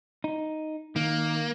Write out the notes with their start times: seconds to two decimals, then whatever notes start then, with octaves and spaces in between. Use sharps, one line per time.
0.24 D#4
0.96 D#3 A#3